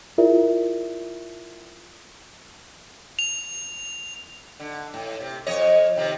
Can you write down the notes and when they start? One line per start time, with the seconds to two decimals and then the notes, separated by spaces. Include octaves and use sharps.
0.18 E4 F4 G#4 A#4 D5 E5
3.19 F7
4.60 D3
4.94 A2
5.20 C3
5.47 F2 C#5 D#5
5.96 C3 D#3